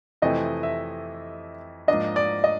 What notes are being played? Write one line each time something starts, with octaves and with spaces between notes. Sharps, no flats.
F2 C3 E3 A3 C4 D#5
E5
G#2 F3 A#3 D4 D#5
D5
D#5